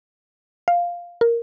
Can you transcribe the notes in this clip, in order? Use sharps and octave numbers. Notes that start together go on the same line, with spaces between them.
F5
A#4